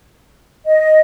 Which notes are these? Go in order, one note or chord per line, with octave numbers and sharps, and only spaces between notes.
D#5